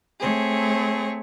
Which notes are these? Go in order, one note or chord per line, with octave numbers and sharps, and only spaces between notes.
A3 C4 G#4 C#5